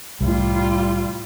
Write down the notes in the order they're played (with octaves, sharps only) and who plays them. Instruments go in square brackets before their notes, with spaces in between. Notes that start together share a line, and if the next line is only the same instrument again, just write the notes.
[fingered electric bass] C2 A2 [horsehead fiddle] G3 F4